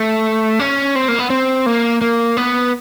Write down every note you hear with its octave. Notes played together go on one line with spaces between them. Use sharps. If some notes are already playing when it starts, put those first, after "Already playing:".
Already playing: A3
C#4
C4
A#3
B3
C4
A#3
A#3
B3